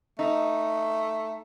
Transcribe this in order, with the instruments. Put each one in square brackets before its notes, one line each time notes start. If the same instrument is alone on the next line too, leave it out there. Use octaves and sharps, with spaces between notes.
[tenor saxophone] A3 [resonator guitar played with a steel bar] D#4